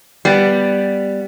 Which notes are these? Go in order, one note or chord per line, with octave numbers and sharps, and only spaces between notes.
G3 B3